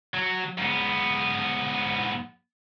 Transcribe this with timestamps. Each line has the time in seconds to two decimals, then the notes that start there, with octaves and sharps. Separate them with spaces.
0.14 F#3
0.58 G#2 B3